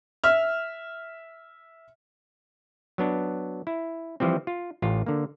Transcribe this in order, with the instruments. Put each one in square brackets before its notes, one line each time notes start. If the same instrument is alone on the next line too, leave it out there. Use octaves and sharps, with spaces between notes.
[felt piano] E5 F6
[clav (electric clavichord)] F#3 B3 D4
E4
E3 F3 G3 C4
F4
A1 F4
D3 A#3